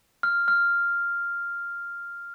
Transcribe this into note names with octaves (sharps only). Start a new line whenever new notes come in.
F6
F6